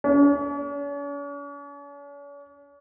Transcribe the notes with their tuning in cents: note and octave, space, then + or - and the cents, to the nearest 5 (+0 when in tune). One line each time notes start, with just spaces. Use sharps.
C#4 +45